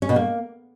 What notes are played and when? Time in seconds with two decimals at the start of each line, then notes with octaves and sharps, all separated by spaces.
0.02 C#4
0.09 B2
0.16 A#3